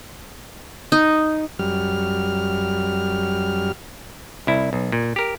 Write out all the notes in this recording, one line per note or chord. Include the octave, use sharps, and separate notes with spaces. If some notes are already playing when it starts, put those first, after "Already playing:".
D#4
F#2 G3 F6
C2 E4
B1
A#2
G4 A#4